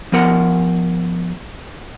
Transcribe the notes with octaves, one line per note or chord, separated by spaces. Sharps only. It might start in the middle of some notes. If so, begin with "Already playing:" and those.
F3 B3 A#4 F#5